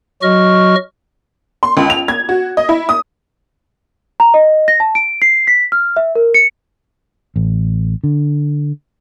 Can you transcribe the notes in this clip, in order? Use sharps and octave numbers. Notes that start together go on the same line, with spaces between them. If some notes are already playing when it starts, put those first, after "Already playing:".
F#3 F#4 D#5 C#6 F6
C6
C#2
F7
G#6
F#4
D#5
E4
D#6
A#5
D#5
A#6
A5
D7
C7
B6
F6
E5
A#4
C#7
A1
D3